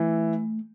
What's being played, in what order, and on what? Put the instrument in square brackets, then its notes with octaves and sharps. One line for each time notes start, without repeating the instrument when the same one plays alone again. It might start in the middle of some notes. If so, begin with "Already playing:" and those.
Already playing: [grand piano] E3 [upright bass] A3